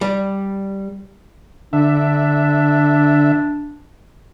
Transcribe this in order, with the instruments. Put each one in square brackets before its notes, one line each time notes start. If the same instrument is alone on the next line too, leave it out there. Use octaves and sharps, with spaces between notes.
[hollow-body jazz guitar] G3
[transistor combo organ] D3 E5 [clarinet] D4